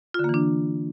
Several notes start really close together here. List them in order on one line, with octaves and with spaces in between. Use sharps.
F4 D3 A#3 E3 D4